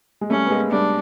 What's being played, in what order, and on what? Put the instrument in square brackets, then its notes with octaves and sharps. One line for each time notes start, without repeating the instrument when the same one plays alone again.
[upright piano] G#3
[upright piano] G3 A3 [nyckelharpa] C#4
[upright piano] B3
G#3 A#3
[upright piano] G3 A3 [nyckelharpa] D4